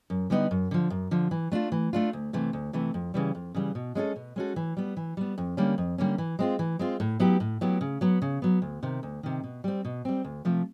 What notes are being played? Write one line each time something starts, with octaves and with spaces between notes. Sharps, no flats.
F#2
D3 G3 B3 D#4
F#2
D3 F3
F#2
D3 F3
E3
A3 D4 F4
E3
A3 D4 F4
D2
C3 E3 A3
D2
C3 E3 A3
F2
C#3 E3 G3
F2
C#3 E3 G3
B2
G#3 C#4 F#4 A4
B2
G#3 C#4 F#4 A4
E3
G3 B3
E3
G3 B3
F2
D3 G3 A#3 C#4
F2
D3 G3 A#3 C#4
E3
G#3 C4 F4
E3
G#3 C4 F4
A2
F#3 B3 E4 G4
A2
F#3 B3 E4 G4
C#3
F#3 B3
C#3
F#3 B3
D2
C3 D#3
D2
C3 D#3
B2
G3 C4
B2
G3 C4
D2
C3 F3 A3